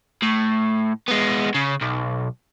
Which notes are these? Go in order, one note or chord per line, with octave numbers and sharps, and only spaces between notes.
A2
G#3 B3
C#3
B1